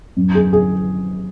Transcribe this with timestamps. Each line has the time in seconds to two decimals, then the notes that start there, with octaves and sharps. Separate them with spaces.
0.17 F#2
0.35 G#4
0.53 G#4